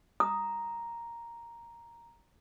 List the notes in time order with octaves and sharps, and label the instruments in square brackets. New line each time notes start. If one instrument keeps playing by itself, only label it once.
[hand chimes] A#5 [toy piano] D#6